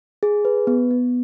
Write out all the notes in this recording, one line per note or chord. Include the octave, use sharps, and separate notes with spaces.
G#4
B4
B3
B3